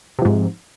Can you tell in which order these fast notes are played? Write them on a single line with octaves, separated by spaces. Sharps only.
C3 F3 G#2